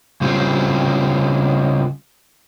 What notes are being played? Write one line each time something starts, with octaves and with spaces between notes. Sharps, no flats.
C#3 G3 C4 C#4 F4